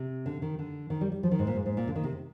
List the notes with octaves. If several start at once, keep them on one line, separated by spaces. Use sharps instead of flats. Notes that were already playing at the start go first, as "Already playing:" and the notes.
Already playing: C3
D3
D#3
D3
D#3
G3
G3
F3
D#3
G#2
A#2
G#2
G#2
A#2
D3
D#3
C3